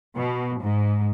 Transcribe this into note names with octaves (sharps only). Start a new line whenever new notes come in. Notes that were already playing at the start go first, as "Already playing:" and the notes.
B2
G#2